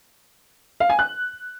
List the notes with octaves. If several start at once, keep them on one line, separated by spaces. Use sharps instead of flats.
F5
G#5
F#6